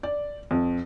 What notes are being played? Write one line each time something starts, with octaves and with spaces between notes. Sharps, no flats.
D5
F2